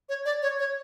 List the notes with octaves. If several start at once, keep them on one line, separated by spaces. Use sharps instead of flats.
C#5
D5
C#5
C#5